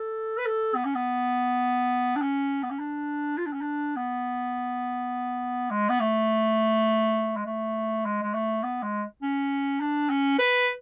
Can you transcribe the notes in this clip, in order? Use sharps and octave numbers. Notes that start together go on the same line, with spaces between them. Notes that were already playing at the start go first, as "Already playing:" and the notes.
Already playing: A4
B4
A4
B3
C#4
B3
D4
C#4
B3
C#4
D4
F4
D4
C#4
D4
B3
G#3
B3
A3
G#3
A3
G#3
G#3
A3
B3
G#3
C#4
D4
C#4
B4